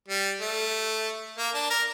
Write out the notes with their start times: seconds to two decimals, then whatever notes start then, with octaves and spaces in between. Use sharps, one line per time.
0.08 G3
0.41 A3
1.38 A#3
1.54 D4
1.70 A#4